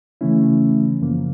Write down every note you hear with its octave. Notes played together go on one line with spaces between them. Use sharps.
C#3 E3 A3 C#4 E4
F#2 C#3 F3 A#3